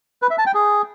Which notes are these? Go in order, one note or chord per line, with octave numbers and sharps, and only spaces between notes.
B4
E5
A5
G5
G#4